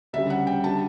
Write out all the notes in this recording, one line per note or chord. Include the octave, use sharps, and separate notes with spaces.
D2 C#3 G3 E5
F#5
G5
D3 G3 A5